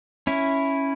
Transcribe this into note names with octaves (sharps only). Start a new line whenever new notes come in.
C#4 E4